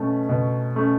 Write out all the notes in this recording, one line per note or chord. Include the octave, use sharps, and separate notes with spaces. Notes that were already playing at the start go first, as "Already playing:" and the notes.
Already playing: B2 A3 C#4
B2
A3 C#4